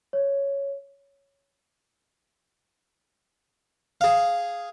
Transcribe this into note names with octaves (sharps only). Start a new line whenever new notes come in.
C#5
G#4 F5